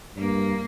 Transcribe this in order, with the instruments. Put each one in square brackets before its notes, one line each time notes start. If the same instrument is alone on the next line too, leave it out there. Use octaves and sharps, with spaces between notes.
[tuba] G2 [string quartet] A#3